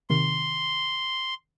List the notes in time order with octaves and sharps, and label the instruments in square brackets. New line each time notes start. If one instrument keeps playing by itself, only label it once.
[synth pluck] C3 D#3 [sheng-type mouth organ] C6